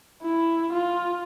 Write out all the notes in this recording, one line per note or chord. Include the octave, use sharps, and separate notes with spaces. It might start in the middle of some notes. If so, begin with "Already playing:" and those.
E4
F4